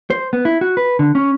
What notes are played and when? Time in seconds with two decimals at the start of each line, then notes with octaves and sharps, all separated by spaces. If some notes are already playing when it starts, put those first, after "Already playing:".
0.10 C5
0.33 B3
0.45 E4
0.61 F#4
0.77 B4
0.99 D3
1.15 C#4